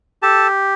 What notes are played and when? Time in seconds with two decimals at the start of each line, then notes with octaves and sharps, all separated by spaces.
0.22 G4 A4 A5